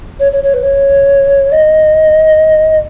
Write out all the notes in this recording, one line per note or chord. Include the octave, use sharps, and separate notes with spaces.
C#5
C#5
C#5
B4
C#5
D#5